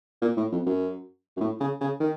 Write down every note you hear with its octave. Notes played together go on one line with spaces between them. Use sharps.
A#2
A2
F2
F#2
F#2
A2
C#3
C#3
D#3